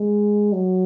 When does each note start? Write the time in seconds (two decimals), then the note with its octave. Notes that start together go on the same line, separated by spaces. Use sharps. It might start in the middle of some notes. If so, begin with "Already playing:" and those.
Already playing: G#3
0.53 F#3